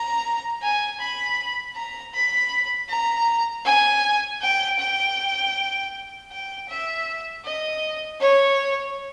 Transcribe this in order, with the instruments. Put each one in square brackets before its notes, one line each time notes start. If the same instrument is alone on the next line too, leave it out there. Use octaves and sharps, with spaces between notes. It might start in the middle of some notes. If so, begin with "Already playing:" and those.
Already playing: [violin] A#5
G#5
B5
A#5
B5
A#5
G#5
G5
G5
G5
E5
D#5
C#5